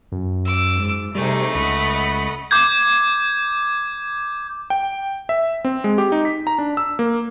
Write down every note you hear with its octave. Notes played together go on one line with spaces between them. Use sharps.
F#2
D6 E6
G#2
C3 G3 A3 D#4 G#4
C#2 D#5 F#5 B5
D6 G6 G#6
G5
E5
C4
G#3
G4
D#4
B6
A#5
D4
E6
A#3